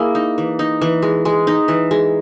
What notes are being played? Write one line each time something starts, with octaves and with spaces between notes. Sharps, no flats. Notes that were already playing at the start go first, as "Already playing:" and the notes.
Already playing: A#3 E4 G#4
D#4
E3
D#4
E3
G#3
G#3
D#4
E3
G#3